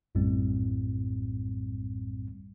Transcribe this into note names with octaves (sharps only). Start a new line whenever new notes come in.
A#1 F#2 A2 G3 C4